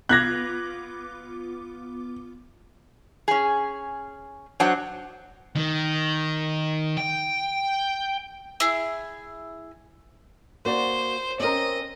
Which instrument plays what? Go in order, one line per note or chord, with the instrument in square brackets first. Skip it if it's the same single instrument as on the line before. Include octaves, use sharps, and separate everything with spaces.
[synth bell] B3 F4 D6 [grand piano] F#6 G#6 A#6
[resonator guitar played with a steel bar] C#4 G#4
F#3 D4 C5 F#5
[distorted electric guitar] D#3
G5
[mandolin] E4 G#4
[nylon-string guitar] A#3 F#4 D5 [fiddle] C5
[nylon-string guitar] C4 C#4 A#4 [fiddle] D#5